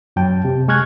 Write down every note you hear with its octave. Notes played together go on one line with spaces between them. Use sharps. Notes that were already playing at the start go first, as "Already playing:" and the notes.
F#2 F#3 G5 A5
C3
G#3 G#5 C#6 F6 F#6 G#6